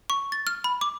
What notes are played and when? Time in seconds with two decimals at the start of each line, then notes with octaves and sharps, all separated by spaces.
0.10 C#6
0.32 A6
0.47 F6
0.64 B5
0.81 D6